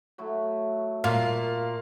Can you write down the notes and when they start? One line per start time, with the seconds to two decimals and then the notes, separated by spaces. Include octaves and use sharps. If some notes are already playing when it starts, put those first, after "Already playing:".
0.18 F#3 A3 E4
1.04 A#2 F5